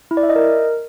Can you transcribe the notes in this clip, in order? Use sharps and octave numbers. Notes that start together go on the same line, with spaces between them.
E4
D5
E5
D#5
A#4